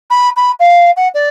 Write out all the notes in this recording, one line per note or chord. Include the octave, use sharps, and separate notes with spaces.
B5
B5
F5
F#5
D5